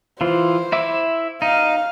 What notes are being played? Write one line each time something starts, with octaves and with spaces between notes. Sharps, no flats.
E3 F4 C5
E4 E5 D6
D#4 F5